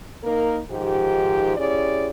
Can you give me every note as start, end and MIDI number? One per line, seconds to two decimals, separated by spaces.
0.23 0.59 58
0.23 0.59 63
0.23 0.59 70
0.70 1.56 44
0.70 1.56 51
0.70 1.56 53
0.70 1.56 67
1.57 2.10 61
1.57 2.10 64
1.57 2.10 67
1.57 2.10 68
1.57 2.10 74